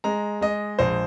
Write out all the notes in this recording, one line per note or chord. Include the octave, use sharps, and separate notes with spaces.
G#3 A#5
G#3 D#5
A#1 C5